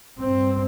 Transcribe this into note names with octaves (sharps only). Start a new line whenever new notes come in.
G2 C4